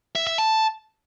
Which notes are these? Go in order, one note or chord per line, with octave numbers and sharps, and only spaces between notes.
E5
E5
A5